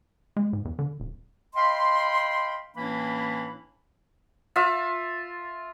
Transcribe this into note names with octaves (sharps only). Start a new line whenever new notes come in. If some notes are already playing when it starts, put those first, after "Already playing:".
G#3
G#2
E2
D3
D#1
D#5 F5 G5 B5 C6
A2 E3 A#3 C#4 D4 B5
F4 E5